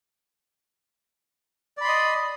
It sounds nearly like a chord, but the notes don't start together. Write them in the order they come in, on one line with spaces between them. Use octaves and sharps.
D5 B5 C6 D#5